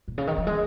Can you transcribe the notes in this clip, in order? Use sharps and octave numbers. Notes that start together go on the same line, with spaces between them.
A#2
C#3
D#3
F3
G#3